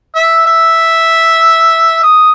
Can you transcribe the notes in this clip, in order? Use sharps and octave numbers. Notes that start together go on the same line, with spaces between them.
E5
E5
D#6